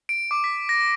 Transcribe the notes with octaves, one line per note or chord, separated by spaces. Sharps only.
D7
D6
B6
A#6